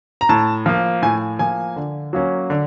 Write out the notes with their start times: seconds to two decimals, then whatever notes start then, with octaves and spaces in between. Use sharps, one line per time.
0.21 A#5
0.29 A2 A5
0.66 F3 A#3
1.02 A2 G#5
1.39 F3 A#3 G#5
1.76 D3
2.13 F#3 A#3 C#4
2.50 D3